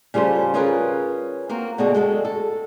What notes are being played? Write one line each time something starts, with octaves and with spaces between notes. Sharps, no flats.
C#3 G3 F4 A4 C5
C#4 F4 G#4 A#4 B4
A#3 C4 F#4
B2 D3 C4 F#4 G#4 A4
G#3 F#4 A4
A4